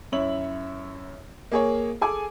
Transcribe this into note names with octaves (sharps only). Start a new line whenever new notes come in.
F#2 E4 C#5 F#7
A#3 G#4 C#5
G#4 A4 G#5 D6